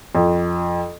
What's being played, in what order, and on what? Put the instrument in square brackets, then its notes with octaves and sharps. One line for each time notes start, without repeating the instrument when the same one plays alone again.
[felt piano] F2